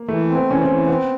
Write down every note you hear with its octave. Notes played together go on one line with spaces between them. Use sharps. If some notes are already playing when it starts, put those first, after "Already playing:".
Already playing: A#3
E3 A3
C4
B3
E3 C#4
C4
E3
B3 C4